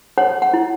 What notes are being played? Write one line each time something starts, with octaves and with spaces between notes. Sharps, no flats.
C#5 F#5
F#5
E4